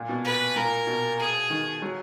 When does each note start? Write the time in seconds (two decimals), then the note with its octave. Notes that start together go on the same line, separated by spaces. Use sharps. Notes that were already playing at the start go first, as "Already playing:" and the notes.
Already playing: A#2
0.09 B2
0.25 B4
0.56 A#2 A#4
0.87 B2
1.19 G#4
1.50 D#3
1.82 F#3